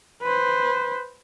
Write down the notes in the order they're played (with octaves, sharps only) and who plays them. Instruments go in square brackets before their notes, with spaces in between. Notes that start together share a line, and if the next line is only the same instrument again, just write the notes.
[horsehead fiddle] B4 C5